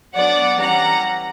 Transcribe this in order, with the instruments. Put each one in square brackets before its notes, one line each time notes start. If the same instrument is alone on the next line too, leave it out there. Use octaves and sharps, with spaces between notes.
[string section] F#3 B3 D4 D5 F#5
E3 G3 C#4 F#5 A#5